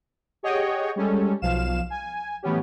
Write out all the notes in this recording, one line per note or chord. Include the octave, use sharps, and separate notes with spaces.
G4 G#4 C#5 D#5 F#5 G5
G3 G#3 C#4 G4 A4
B1 F3 F5 E7
G#5
A2 E3 F#3 B3 C#4 G4